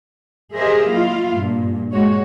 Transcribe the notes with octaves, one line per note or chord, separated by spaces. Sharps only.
G4 G#4 A#4 C5 D#5 E5
F#3 A#3 E4 F4 F5
G2 A#2
G2 G#3 F#4 C#5